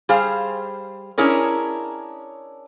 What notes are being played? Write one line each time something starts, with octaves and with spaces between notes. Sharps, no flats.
G3 G#4 C5 F5
C#4 D4 E4 G#4 A#4 C#5